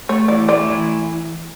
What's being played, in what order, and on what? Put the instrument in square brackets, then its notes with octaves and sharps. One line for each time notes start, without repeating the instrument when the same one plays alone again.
[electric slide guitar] A3 [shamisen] C#5
[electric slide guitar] E3 [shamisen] D5
[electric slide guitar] A3 [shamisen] D5
[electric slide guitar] E3